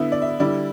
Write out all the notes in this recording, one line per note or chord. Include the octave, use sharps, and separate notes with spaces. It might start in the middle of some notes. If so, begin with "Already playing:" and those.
Already playing: D3 B3 E4 E5
D5
E5
D3 G3 E4 D5